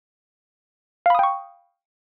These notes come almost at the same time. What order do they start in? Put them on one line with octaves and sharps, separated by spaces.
F5 B5 D#6 G5 C#6